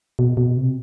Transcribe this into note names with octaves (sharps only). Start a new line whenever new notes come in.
B2
B2
C3